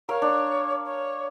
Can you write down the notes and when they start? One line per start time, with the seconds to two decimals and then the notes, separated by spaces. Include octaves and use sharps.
0.09 A#4 C#5 F5
0.22 D4
0.85 C#5